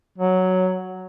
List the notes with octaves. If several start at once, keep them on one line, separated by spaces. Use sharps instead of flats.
F#3